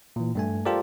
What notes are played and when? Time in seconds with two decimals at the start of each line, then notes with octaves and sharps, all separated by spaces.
0.16 A#2 E3
0.35 G2 A3 G#5
0.66 F4 G4 A4 A#4 C5 D5